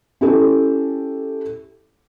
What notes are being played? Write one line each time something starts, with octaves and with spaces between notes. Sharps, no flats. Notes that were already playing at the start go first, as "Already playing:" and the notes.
C#4 E4 G4 A4